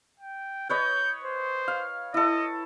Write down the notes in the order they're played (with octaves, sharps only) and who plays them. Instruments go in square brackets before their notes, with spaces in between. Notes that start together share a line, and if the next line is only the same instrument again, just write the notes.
[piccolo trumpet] G5
[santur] B4 C#5 D#5 [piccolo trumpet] G6
[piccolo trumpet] C5
[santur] F5
[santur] E4 A4 [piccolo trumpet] D#5